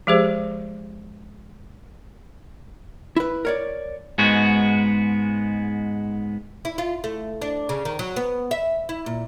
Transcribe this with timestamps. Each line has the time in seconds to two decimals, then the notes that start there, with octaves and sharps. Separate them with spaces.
0.07 F3 G#3 G4 G#4 C5
3.16 E4 B4
3.45 A#4 C#5 D5
4.18 G#2 G#3 B3 F#4
6.65 E4
6.78 F4
7.04 A3
7.42 D4
7.69 C#3
7.85 D#3
7.99 F#3
8.16 B3
8.51 E5
8.89 E4
9.06 A#2